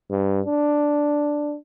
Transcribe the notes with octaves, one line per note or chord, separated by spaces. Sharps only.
G2
D4